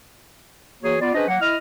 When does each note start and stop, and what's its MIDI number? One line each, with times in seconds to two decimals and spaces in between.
0.83 0.96 52
0.83 0.96 58
0.83 0.96 66
0.83 0.96 68
0.83 0.96 73
1.01 1.11 59
1.01 1.11 65
1.01 1.11 74
1.14 1.26 61
1.14 1.26 62
1.14 1.26 68
1.14 1.26 71
1.14 1.26 72
1.14 1.26 75
1.28 1.36 54
1.28 1.36 58
1.28 1.36 78
1.41 1.56 64
1.41 1.56 75
1.41 1.56 89